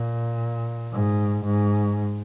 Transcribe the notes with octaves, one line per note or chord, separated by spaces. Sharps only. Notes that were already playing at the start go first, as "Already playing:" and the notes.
Already playing: A#2
G#2
G#2